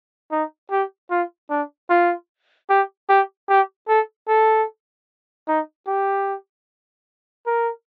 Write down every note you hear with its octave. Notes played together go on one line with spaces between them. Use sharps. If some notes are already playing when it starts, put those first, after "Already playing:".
D#4
G4
F4
D4
F4
G4
G4
G4
A4
A4
D#4
G4
A#4